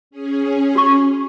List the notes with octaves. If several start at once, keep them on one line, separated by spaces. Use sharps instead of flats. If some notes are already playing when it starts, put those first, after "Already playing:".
C#4 G#4
F#4 C#6